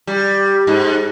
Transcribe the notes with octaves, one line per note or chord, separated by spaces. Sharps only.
G3
G#2